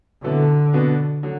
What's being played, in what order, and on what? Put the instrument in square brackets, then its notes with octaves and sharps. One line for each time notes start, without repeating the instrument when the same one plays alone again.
[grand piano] B2 F#3 B3 E4 A4 [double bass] D3
[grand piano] B2 B3 D4 F#4
D3 F#3